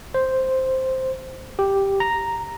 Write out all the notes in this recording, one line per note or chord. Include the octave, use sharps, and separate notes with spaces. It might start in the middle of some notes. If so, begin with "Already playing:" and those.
C5
G4
A#5